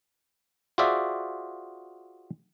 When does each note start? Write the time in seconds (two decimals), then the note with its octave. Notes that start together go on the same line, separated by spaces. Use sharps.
0.78 F4 F#4 G#4 C5 D5 E5